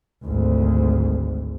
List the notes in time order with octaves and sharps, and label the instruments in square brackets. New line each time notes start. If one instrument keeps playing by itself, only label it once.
[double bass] G#1 D2